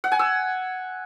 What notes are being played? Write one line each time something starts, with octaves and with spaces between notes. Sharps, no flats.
F#5
G#5
E6